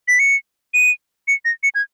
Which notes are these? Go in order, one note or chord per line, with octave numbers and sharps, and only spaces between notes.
B6
C#7
D#7
C#7
A#6
C#7
G#6